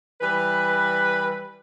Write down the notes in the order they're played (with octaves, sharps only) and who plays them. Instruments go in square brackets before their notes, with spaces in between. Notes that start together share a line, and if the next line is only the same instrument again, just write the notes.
[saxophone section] E3 G3 B4